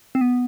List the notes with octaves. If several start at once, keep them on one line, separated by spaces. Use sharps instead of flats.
C4
B3